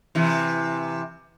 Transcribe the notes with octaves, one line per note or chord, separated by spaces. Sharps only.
C3 E3